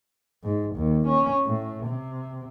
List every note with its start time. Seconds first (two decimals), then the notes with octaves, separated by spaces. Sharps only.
0.43 G#2
0.76 D#2
1.08 C#4
1.45 A2
1.86 C3